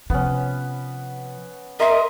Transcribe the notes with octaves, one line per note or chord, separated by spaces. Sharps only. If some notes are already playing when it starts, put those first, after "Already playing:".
C3 F3 B3 C#4
A#4 D#5 E5 A#5 C6